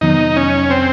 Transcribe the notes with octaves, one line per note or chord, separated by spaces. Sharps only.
F2 C3 D#3 F#3 B3 D#4
C#4
C4